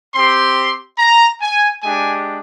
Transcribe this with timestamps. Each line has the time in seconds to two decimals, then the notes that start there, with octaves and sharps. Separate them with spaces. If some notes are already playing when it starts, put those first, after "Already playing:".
0.14 C4 G4 C6
0.99 A#5
1.41 G#5
1.83 G#3 D4 G4 G#5